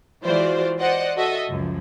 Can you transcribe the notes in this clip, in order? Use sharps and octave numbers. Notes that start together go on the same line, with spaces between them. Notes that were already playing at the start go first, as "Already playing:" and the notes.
E3 G#3 F4 F#4 C5 D5
C5 D5 D#5 F#5
F#4 A4 D#5 E5
C#2 F#2 F3